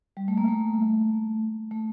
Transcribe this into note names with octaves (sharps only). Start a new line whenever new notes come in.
G3
A3
A#3
A3
A3